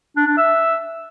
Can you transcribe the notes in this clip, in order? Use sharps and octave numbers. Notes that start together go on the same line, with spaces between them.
D4
D4
E5